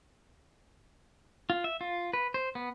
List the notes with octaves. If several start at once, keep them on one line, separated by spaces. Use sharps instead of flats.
F4
E5
F4
B4
C5
B3